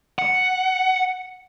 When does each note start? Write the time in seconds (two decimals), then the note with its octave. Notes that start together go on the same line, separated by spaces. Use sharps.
0.19 F#5